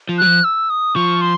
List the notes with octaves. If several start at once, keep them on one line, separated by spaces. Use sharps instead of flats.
F3
F#3 F#6
F3
E6
D#6
F3 C#6
C6